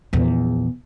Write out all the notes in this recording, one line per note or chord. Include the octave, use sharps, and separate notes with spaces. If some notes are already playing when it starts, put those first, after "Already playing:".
A#1 E2